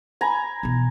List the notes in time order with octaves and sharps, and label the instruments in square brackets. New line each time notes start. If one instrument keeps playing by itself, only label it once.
[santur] G#5 A#5 B5
[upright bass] B2 E3